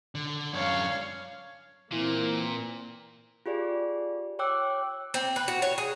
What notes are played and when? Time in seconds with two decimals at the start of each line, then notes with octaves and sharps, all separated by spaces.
0.15 D3
0.53 F#2 D4 C#5 F5
1.92 A#2 E3 A#3 C4
3.46 F4 G4 G#4 D5
4.39 C#5 G5 D6 E6 F#6
5.14 C4
5.36 B4
5.48 F#4
5.62 C#5
5.78 G#4